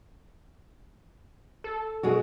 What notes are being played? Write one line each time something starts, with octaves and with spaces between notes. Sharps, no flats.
A4
B2 G#3 F#4